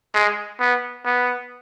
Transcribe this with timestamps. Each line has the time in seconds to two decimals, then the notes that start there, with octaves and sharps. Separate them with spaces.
0.14 G#3
0.60 B3
1.06 B3